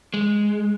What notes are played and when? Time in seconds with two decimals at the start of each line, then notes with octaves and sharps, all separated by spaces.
0.14 G#3